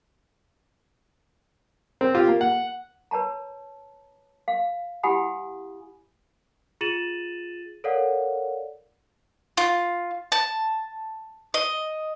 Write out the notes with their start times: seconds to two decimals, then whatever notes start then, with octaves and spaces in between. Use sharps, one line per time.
2.01 C4
2.15 F4 G4
2.28 A#3
2.41 F#5
3.11 B4 C#5 A5 A#5
4.48 F5
5.03 E4 G4 F#5 G#5 B5 D#6
6.81 F4 G#4 A6 D#7 E7 F#7
7.84 A4 A#4 C#5 D5 F5 F#5
9.57 F4
10.32 A5
11.54 D#5